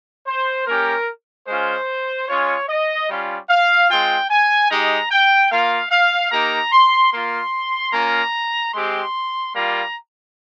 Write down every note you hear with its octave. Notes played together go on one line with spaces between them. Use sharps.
C5
A#3 C#4 G4 A#4
G#3 C#4 F4 C5
G#3 C#4 F4 C#5
D#5
G3 C#4 F4
F5
G#3 C4 F4 G5
G#5
G#3 D#4 G4 A#5
G5
A#3 F4 F5
F5
A#3 D#4 G4 A#5
C6
A#3 F4 C6
A#3 C#4 F4 A#5
G#3 C4 G4 C6
G3 A#3 F4 A#5